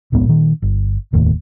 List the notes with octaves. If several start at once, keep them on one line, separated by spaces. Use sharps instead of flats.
D1 A#1 G#2 B3
A#2 D#3
G1
F1 D#2 A2